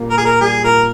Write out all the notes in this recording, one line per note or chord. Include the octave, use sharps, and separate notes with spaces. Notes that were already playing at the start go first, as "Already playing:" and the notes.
Already playing: A#2 G3 A#3
A#4
A#2 G#4
A#4
G3 G#4
A#2 A#4